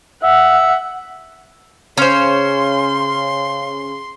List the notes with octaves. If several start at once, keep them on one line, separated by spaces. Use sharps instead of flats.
E5 F#5
C#3 C#4 C5 C6